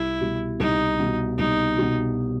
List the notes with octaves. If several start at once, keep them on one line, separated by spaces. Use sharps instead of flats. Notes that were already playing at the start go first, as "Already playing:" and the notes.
Already playing: C2 E4
B2 G3
C2 D#4
B2 G3
C2 D#4
B2 G3